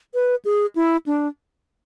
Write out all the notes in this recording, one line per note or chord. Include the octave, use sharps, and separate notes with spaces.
B4
G#4
E4
D4